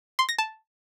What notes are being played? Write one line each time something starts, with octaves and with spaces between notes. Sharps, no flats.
C6
A#6
A5